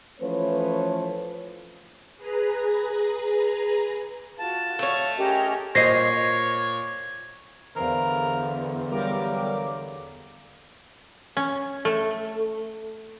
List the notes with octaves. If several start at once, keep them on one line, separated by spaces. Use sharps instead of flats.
E3 F3 A3 C#4 B4 C#5
G#4 B4 A#5
F4 F#4 A5
A3 C#5 F5
C#4 G4 G#4 A#4 D#5
A#2 C5 C#5 D#5 A#6 C7
E2 D3 A#4 C5 D5 F5
F#3 G3 A#4 F5 D6
C#4
A3